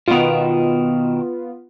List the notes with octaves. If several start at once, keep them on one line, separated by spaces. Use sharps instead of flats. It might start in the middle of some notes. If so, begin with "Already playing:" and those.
B2 D#3 B3 F4